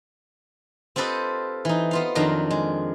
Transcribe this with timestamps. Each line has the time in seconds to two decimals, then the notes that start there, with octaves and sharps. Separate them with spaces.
0.96 C4 F4 G4 A4 B4 D#5
1.65 E3 D#4
1.91 B3 F4 F5
2.15 F2 D#3 F#3 D4 F5 A#5
2.50 G#3